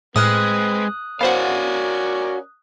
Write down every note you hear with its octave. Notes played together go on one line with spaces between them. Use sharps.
A2 G#3 C4 B4 D#6 F6 F#6
B3 C#4 F#4 A#4 C5 D5 F5 F#5